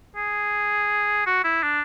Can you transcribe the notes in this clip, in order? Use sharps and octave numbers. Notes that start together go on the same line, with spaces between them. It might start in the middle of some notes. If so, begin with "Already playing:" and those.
G#4
F#4
E4
D4